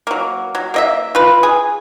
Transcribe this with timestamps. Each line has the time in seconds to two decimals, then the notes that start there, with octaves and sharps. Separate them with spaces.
0.07 F#3 A#3
0.55 F#3
0.74 A#3 D#5 E5
1.15 F4 B4
1.43 G#4